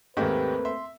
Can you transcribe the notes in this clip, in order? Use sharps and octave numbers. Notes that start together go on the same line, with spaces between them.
D#2 G#2 A3 A#3 C4 G4 B4 G5
E5 C6